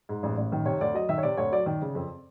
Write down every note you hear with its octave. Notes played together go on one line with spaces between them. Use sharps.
G#2
A1
A1
D#3
C3 C#5
D2 D5
F#3 D#5
D#3 E5
C#5
C3 D5
D2 C#5
F#3 D5
D#3 D5
C#3
F2